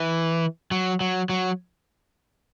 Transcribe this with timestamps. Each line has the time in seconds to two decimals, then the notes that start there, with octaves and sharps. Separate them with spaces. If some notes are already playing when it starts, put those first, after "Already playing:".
Already playing: E3
0.71 F#3
1.01 F#3
1.29 F#3